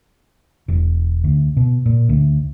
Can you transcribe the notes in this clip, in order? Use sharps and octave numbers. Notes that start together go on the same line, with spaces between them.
E1
D2
B2
A#2
D2